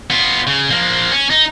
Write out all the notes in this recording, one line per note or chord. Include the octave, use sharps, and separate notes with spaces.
B3 F4
C#3
F3 A#3
C#4
D#4